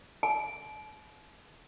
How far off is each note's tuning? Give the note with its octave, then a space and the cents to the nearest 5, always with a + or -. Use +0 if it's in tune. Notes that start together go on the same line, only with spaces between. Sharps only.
A5 -45